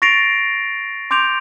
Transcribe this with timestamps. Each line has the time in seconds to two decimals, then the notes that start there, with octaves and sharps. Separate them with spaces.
0.02 C#6 A6 A#6 C7 D7 F7
1.11 C6 D6 G6 D7 F7